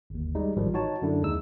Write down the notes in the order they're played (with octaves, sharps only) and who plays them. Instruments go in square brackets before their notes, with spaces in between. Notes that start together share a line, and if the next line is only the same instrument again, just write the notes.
[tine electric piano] G1 D#2
G3 G#3 D#4
A1 G#2 D#3 F3 G3
D#4 F#4 C#5 A5
F#2 D3 D4 E4
D#2 G#3 D#4 E6